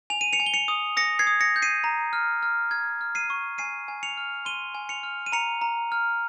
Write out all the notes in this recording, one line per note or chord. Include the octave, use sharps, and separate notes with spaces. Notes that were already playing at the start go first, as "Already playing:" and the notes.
G#5 F7
D#7
C#7 F7
G#5
G7
C#7 F7
D#6
D#6 A#6 C#7
G#6 C7
D#6
A#6 C#7
G6
C7 D#7
A#5
F6
F6
F6 G#6
F6
C7 D#7
C#6
G#5 C7 D#7
G#5
C#7 F7
F6
C6 D#7 G7
G#5
C#7 F7
F6
D#7
A#5 C#7 F7
A#5
F6